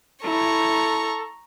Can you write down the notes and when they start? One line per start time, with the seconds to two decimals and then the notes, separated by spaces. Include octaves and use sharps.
0.23 E4 A4 A#5 C#6